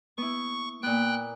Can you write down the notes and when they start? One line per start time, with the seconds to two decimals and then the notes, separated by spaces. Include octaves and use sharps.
0.18 B3 E4 C#6
0.83 A#2 B3 G5 F#6